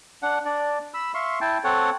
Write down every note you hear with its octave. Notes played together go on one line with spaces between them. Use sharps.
D4 F#5
D4 D5
B5 E6
E5 F5 C6 C#6
E4 G5 A5
C4 A4 C#5 F#5